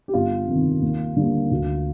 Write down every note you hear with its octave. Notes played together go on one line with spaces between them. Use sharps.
G4
G1 F4
F2 C3 D#3
D#2
D3 G3 A#3
D2